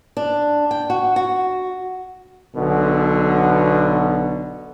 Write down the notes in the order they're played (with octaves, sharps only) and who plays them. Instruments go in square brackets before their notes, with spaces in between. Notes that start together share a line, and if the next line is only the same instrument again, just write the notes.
[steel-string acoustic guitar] D4
G5
F#4
F#4
[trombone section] B1 B2 D3